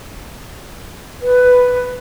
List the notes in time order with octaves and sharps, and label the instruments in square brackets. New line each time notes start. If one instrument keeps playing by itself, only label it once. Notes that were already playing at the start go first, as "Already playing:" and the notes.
[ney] B4